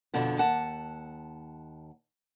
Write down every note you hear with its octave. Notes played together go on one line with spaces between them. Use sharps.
F2 B2 D3 B3
D#2 F#5 A5